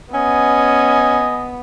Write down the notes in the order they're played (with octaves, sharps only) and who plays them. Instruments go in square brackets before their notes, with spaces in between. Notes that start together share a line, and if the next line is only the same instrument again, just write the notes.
[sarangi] B3 [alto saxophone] C#4 [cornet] D#5 [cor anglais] G#5